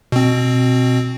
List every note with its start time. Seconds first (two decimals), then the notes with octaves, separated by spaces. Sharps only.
0.12 B2 C4